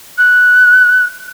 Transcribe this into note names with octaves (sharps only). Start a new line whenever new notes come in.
F#6